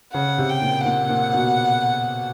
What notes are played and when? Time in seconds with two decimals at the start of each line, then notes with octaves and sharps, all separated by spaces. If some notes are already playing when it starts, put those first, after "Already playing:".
0.14 C#3 F#5
0.38 C3
0.49 G5
0.62 A#2
0.85 A#2 F#5
1.09 A#2
1.33 B2